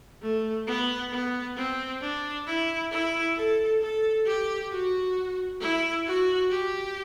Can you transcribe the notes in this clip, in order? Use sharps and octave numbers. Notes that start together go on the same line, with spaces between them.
A3
B3
B3
C4
D4
E4
E4
A4
A4
G4
F#4
E4
F#4
G4